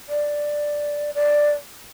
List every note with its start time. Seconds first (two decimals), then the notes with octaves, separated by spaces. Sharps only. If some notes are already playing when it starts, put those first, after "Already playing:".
0.09 D5
1.14 D5